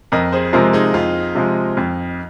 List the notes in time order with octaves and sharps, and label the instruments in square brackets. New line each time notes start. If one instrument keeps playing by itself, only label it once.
[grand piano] F2 [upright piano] A#4 D#5
[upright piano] G#4 C5
[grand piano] C3 F3 G#3 [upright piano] F4 A#4
[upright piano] D#4 G#4
[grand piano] F2 [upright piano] F4
[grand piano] C3 F3 G#3
F2